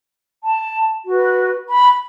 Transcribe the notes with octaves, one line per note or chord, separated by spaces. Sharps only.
A5
F#4 B4
B5